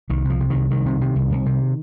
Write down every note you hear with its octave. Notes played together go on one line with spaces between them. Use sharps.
C2 D#3
C3 F3
C3
C2 D#3
C2 D#3
C3
C3
C2
C2
C3